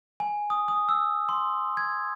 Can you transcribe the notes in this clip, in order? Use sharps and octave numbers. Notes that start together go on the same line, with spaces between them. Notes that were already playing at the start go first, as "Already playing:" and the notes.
G#5
D#6
D#6
E6
C6
G#6